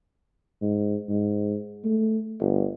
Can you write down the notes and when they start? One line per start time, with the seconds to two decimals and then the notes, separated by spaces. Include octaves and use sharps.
0.61 G#2
1.09 G#2
1.84 A3
2.40 G1